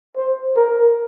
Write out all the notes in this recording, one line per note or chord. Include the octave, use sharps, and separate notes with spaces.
C5
A#4